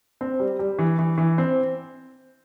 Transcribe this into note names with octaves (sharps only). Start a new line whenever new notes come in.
C4
G3
G3
E3
E3
E3
C4